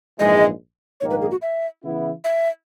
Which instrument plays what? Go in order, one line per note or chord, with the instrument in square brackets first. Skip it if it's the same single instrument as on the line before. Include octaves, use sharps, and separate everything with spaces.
[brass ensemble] A#1 G#2 E3 G#3 [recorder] D#5
[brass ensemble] A#1 G#2 D#3 A#3 [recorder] C#5
[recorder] B4
G#4
F#4
E5
[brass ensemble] C#3 E3 B3 E4
[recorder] E5